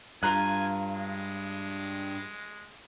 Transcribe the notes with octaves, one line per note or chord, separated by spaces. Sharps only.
G2 F4 G#5 A#5 F#6
G#3